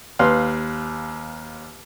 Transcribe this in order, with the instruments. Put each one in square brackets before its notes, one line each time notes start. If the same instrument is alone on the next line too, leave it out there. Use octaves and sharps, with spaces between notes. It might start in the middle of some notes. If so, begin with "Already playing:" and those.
[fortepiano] D#2 B4 F5 C6